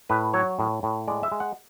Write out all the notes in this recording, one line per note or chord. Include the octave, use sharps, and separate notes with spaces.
A2 B4
F#3 C#5
A2
A2
G#3 D5
E5
G#3
F#5